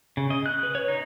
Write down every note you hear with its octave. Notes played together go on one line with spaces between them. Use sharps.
C#3
D#5
F#6
B4
C#5
D#4